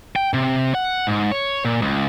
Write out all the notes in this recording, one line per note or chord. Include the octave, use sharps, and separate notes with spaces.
G5
C3
F#5
G#2
C#5
A#2
C#2